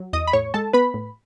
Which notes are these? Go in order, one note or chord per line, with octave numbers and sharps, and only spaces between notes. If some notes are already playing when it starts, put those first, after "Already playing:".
Already playing: F#3
E2 D#5 D#6
B5
A2 C#5 C#6
G#3 A4 A5
B3 B4 B5
A2